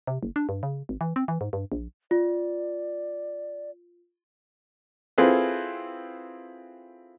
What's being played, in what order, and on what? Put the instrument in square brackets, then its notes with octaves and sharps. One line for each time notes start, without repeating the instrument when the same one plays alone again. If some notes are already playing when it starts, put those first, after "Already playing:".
[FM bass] C3
F#1
D4
G2
C#3
G#1
E3
C4
E3
G#2
G2
A#1
[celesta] F4 [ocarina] D5
[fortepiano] C4 E4 F4 G#4 A4 B4